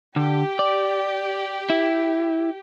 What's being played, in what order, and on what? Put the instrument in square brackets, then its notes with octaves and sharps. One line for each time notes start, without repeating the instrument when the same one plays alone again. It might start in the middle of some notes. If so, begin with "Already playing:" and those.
[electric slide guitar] D3 [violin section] G4
[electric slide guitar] D5
E4